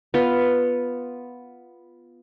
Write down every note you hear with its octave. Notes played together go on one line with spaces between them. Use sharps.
B3 F4